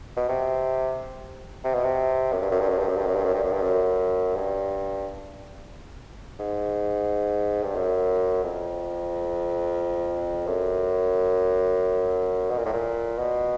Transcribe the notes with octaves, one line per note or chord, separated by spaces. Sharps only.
B2
C3
C3
B2
C3
F#2
G2
F#2
G2
F#2
G2
F#2
G2
F#2
G2
F#2
G2
F#2
G2
F#2
G2
G#2
G2
F#2
F2
F#2
B2
A#2
A2
A#2
B2